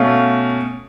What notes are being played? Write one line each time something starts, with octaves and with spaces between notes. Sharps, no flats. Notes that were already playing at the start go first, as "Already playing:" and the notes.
Already playing: B2 A3 C#4 F5